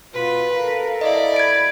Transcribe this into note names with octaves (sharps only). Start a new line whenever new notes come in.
B2 F4 B4
A4 A#4 F5
E4 D5 D#5
B5 G#6 A6 D7